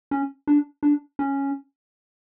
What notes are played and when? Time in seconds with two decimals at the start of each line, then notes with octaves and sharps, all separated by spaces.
0.11 C#4
0.47 D4
0.83 D4
1.19 C#4